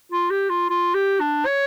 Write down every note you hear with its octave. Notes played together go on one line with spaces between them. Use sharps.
F4
G4
F4
F4
G4
D4
C#5